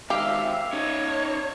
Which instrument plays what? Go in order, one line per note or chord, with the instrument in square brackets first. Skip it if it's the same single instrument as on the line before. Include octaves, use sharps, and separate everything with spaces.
[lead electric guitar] G#2 D#3 [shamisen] G4 [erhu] E5 [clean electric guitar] F5
[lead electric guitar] C#4 D#4 [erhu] C#5